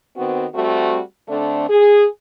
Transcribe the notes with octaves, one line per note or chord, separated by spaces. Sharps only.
D#3 B3 C4 F#4
G3 A3 C4 F#4
D3 A3 C4 D4
G#4